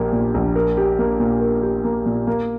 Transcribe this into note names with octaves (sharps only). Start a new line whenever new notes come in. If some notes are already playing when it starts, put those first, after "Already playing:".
Already playing: A#1 A#2 A#3 G4
A#2
A#1
A#4
G4
A#3
A#2
A#4
G4
A#3
A#2
A#3